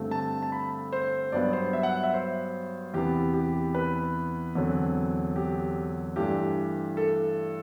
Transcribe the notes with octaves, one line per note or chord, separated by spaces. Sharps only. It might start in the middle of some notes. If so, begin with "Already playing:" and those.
Already playing: G2 D3 A3 C4
A5
A5
B5
C5
G2 F#3 B3 D5
C5
E5
F#5
E5
C5
E2 C3 E3 B3 G4
G4
B4
E2 D3 F#3 C4
G4
G2 E3 A3 D4 G4
A4